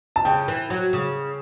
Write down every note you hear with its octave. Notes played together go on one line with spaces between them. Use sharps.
A5
C#3 G5
E3
F#3
C#3